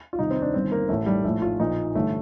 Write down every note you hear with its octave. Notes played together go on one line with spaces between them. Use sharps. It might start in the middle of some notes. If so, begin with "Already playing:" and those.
F4
C2 C3 D#3 D#4
C4
D4
G1 G2 D#3 C4
A#3
A1 A2 A3
G3
A#1 A2 A3
F4
A#1 A#2 D#4
A1 G2 D3 A3